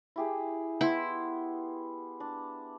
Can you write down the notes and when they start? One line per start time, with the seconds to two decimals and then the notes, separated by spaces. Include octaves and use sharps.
0.16 E4 G4 G#4
0.81 B3 E4 C6
2.20 D4